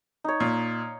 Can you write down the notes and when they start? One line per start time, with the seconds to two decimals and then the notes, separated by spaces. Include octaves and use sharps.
0.24 D#4 C#5
0.40 A#2